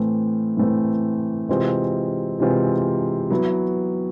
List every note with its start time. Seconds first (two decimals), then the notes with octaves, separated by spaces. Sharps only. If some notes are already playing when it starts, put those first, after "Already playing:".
Already playing: A2 E3 A3 C4
0.57 A2 E3 A3 C4
1.49 C3 E3 G#3 C4 F4
2.40 C3 E3 G#3 C4 F4
3.30 F#3 B3 E4